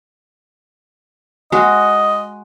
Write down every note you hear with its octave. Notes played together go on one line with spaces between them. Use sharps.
G#3 F#4 D#5